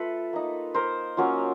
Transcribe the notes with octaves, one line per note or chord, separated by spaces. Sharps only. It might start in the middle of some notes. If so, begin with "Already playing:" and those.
Already playing: A3 F4 A4 B4
A#3 D#4
A#4 C5
F#3 A#3 C#4 F4